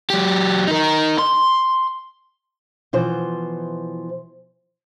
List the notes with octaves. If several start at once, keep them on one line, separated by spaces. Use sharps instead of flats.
F#3 G4
D#4 A#4
C6
B2 E3 F3 C5